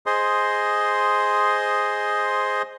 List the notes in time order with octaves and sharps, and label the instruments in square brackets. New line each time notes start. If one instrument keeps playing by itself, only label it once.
[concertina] G#4 C5 D#5 C6